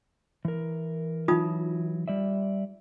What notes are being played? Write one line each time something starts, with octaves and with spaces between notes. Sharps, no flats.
E3 A#4
E3 F#3 D#4 F4 D#6
G3 D5 E5